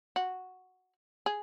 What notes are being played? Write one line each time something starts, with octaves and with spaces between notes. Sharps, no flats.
F#4
G#4